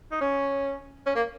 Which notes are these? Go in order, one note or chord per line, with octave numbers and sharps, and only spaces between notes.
D#4
C#4
C#4
A#3